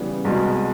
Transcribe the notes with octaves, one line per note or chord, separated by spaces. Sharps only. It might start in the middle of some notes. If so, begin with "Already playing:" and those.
Already playing: C#3 E3 G3 B3
C2 B2 G#3